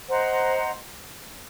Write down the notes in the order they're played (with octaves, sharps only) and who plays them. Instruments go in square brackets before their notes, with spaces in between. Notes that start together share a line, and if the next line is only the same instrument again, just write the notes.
[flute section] C5 D#5 F#5 A#5